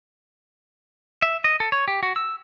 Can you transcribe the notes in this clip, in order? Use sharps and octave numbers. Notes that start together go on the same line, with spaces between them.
E5
D#5
A4
C#5
G4
F#4
E6